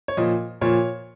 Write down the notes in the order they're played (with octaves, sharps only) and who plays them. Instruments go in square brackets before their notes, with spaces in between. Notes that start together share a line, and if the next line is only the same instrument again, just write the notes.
[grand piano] C#5
A#2 F3 D#5
A#2 F3 C#5